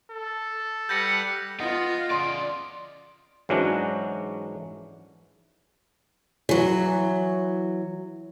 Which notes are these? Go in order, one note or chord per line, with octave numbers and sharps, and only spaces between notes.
A4
G3 B4 F#5 G6 A#6 C#7
B3 F4 D#5 F#5
C#3 D5 C6
G#2 E3 F#3 C#4 D4 F#4
E3 F#3